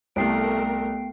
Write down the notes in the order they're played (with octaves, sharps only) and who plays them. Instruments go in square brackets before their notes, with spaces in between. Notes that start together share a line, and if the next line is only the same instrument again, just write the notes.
[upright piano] C2 [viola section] A3 A#4 [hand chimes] B3 C7 D7 [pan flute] G5